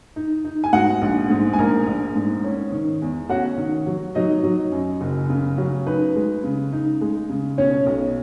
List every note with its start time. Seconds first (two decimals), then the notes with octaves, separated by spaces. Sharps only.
0.16 D#4
0.45 D#4
0.64 G#5
0.73 G#2 F#4 F#5
1.02 A#1
1.30 G#2
1.53 G#5
1.58 A#1 A#4 A#5
1.87 A#1
2.15 G#2
2.44 C#4
2.72 D#3
3.02 E2
3.29 C#4 F#4 F#5
3.58 D#3
3.86 F#3
4.15 F#3 D#4 D#5
4.43 F#3
4.72 F#2
5.01 F#1
5.29 C#3
5.58 F#3
5.86 D#4 B4
6.16 G#3
6.44 C#3
6.73 D#4
7.01 G#3
7.29 C#3
7.58 B2 C#4 C#5
7.86 B1